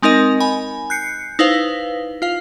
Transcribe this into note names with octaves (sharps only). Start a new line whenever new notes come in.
G#3 C4 D#4 A#4 D#5
G#5 B5
F#6 G6 C7 C#7
D#4 E4 B4 C5 F5
F4 F5